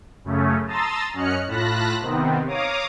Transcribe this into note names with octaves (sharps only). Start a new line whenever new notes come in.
F#2 C#3 A3 C#4
A5 A#5 C6 D#6 E6 A6
F#2 C#4 D#5 F6 F#6 C#7
A2 F4 A5 B5 F#6 A#6
C3 D#3 B3 C4
C#5 F5 A#5 D6 D#6